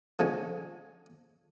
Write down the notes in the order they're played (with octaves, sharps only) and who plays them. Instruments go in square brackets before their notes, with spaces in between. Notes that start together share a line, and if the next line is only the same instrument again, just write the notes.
[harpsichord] D3 F3 G#3 C#4